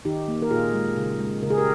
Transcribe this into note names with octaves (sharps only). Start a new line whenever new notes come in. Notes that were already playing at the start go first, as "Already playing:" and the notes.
D#3 D#4 G4
A#3
A#4
A#2 F4 G#4
G#3
C#3
G#3
C#3 A#4
G#4
G4 A#4